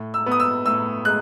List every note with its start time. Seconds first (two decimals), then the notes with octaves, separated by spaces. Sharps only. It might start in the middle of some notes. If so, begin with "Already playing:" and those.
Already playing: A2
0.14 E6
0.26 B3
0.31 D#6
0.40 E6
0.66 A2 E6
1.05 G#3 F#6